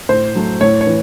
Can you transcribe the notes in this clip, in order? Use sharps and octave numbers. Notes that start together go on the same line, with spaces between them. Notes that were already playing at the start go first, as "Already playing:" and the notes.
A2 C5
F#3 A3
A2 C#5
C#5
E3